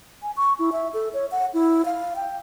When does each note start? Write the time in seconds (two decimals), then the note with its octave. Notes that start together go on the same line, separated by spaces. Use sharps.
0.22 G#5
0.37 C#6
0.59 E4
0.72 E5
0.94 A4
1.13 C#5
1.31 F#5
1.54 E4
1.85 F5
2.16 G5